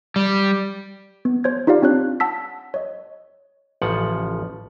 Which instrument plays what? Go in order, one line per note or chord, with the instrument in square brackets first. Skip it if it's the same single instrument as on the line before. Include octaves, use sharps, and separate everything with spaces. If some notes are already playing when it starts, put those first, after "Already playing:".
[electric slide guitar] G3
[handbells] B3
C5 C#5 G#6
D#4 F4 G4 D5 F5
C4 D4 C#5 F#6
F#5 A5 E6 B6
C#5 D#5
[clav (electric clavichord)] A1 C#3 F3 F#5